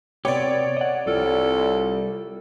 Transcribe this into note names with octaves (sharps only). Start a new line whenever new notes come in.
C3 B3 G4 C#5 D5
D#5 F#5
C2 G3 F4 A4